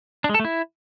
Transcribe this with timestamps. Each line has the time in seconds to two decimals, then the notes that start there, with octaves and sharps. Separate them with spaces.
0.24 D4
0.29 G#3
0.34 A4
0.40 A3
0.45 E4